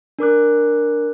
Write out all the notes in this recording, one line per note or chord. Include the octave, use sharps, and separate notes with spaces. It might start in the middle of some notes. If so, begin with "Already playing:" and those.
D4 A#4 D6 F#6